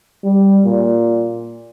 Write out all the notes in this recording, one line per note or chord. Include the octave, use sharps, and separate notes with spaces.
G3
A#2